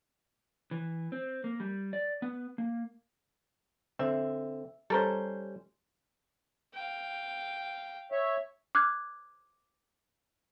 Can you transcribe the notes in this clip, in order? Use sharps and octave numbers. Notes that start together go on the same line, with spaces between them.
E3
C4
A#3
G3
D5
B3
A#3
D3 C4 E5
G3 C#4 A4 A#4 C5
F5 G5
C#5 E5
D6 F6 F#6 G#6